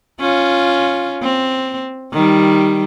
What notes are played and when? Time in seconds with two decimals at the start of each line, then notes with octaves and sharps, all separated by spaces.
0.20 C#4 F4
1.23 C4
2.13 D#3 G3